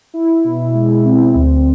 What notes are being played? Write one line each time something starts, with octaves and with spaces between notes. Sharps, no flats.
E4
B2
G#3
C4
D2